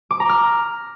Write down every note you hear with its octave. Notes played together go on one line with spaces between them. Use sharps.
D6
A#5
F6